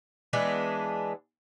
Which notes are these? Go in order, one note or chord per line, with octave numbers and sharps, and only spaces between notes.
E3 G#3 B3 D4